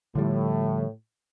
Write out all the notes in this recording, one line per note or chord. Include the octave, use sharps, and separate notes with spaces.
A2 D3 F3 G3